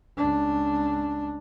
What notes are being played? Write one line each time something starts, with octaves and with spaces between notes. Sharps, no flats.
C#2 D4